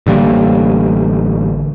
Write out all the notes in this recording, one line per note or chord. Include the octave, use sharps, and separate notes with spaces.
A1 D3 G3 A#3